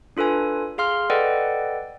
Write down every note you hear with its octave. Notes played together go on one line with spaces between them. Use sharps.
D4 F4 A4 B4 G#5
G#4 F5 C6 F6
A4 B4 D5 D#5 F#5 G5